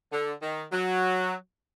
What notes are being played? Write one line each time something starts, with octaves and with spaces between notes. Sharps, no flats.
D3
D#3
F#3